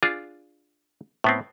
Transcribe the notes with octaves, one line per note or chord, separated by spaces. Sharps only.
D4 F4 G#4
A2 B3 C4